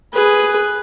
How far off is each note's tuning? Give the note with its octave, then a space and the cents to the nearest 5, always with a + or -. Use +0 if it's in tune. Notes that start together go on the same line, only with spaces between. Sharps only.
G#4 +0 B4 +0